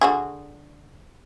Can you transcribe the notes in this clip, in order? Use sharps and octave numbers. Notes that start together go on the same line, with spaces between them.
D3 F#4 G#4